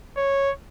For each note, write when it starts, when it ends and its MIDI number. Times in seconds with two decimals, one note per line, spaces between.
0.17 0.51 73